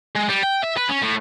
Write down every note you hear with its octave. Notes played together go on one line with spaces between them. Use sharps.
G#3
G3
G5
E5
B4
C#4
A2